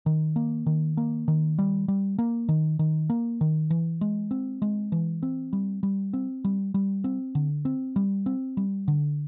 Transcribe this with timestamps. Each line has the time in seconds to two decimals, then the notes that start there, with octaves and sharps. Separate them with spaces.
0.06 D#3
0.36 A#3
0.66 D#3
0.97 A#3
1.28 D#3
1.58 G3
1.88 G3
2.18 A#3
2.49 D#3
2.79 D#3
3.10 A#3
3.41 D#3
3.70 E3
4.01 G#3
4.31 C4
4.62 G#3
4.92 E3
5.23 C4
5.53 G3
5.83 G3
6.13 C4
6.44 G3
6.74 G3
7.04 C4
7.35 D3
7.65 C4
7.96 G3
8.26 C4
8.57 G3
8.88 D3